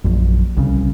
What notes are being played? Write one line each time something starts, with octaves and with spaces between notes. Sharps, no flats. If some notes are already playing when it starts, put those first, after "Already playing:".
A#1 F#2
C2 C#3